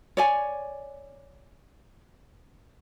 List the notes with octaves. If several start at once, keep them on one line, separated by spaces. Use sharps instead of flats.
C#5 D5 G#5